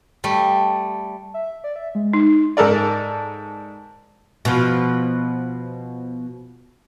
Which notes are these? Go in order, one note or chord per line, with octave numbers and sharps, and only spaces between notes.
G3 A3
E5
D5
E5
G#3
D#4
G#2 A4 A#4 D5
B2 F3